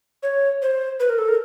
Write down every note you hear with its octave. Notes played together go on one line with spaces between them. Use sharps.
C#5
C5
B4
A#4
A4
A#4